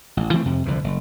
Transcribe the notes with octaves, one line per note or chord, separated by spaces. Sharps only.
A1
E3 A3 C4
F2 C3
C2 D3 E3 F3
F#1